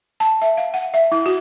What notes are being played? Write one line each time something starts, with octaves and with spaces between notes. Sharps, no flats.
A5
E5
F5
F#5
E5
E4
F#4